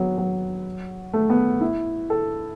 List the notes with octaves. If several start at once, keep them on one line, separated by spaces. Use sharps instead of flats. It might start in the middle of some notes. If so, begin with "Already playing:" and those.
Already playing: F#3 B3
F#3
A3
B3
E4
A4